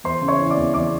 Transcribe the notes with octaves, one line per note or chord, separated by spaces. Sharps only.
E2 C5 C6
C#3
C#5 C#6
E3
D5 D6
E2
E2 D5 D6